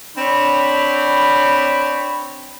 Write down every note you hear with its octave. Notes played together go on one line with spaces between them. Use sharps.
C4 D4 C#5 B5